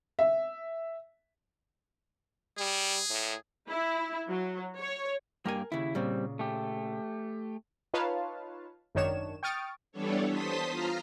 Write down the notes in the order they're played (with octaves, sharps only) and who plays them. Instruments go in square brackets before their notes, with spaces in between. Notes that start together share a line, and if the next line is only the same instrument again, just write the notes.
[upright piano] E5
[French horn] G3 [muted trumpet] G#4
[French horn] A2
[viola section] E4
F#3
C#5
[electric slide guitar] G2 A#3 G4 [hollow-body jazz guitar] A#4 G#5
[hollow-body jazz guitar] D#2 C#3 [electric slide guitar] E4
[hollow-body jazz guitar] A#2 C#3 [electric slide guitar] G3 C4
[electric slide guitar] A3 G4
[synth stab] D#4 F4 B4 C#5 F5 A5
G#1 F#2 D#3 D4 C#5 E7
G5 C#6 D#6 F6 A6 D7
[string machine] E3 G3 B3 D4 A4 C#5
C5 A5 C6 D#6 B6
F4 A#5 F6